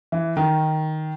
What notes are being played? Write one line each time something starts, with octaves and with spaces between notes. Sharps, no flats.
E3
D#3